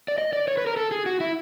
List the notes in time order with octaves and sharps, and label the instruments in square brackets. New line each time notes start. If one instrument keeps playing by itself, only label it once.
[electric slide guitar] D5
D#5
D5
C#5
B4
A#4
A4
G#4
F#4
E4